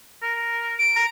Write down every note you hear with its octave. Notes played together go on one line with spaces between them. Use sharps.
A#4
D7
A#5